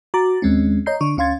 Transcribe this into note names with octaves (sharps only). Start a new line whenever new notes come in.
F#4 A#5 D6 A6
D#2 G#3 C4 C#4
C#5 D#5 A#5 G6 C7
D3 D4 C#6
D2 C#4 F5 C6 G#6 A6